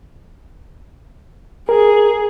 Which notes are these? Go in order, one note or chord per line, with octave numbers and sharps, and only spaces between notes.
G#4 A#4